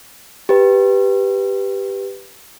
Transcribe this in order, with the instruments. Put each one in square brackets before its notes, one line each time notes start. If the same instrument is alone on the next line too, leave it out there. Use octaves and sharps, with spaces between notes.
[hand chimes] G4 B4